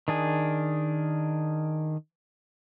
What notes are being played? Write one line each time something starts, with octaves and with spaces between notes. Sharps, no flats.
D#3 D4 G#4